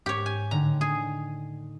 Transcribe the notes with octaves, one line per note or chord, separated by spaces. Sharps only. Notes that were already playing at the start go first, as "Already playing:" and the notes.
G#2 G4 C#5
G#5
A2 D3 D#3 A#5
G#4 D#7